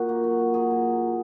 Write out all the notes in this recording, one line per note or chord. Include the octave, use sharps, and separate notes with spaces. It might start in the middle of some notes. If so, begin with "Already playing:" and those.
Already playing: A#2 D#4 F#4
A#3
F#3
F#3
F#3 G#4
A#2